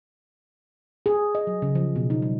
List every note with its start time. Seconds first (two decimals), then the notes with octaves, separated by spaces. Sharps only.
1.06 G#4
1.35 D#5
1.47 F#3
1.62 C#3
1.75 F3
1.96 B2
2.10 D#4
2.22 G3